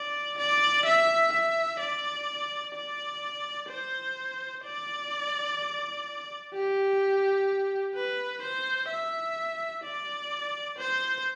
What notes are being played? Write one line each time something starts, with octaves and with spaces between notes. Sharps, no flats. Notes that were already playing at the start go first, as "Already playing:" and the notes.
Already playing: D5
D5
E5
E5
D5
D5
C5
D5
G4
B4
C5
E5
D5
C5